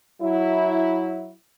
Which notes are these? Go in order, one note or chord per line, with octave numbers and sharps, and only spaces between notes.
F#3 E4